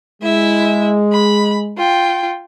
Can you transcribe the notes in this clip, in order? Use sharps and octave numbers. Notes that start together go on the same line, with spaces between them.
G#3 E4 E5
B5
F4 G5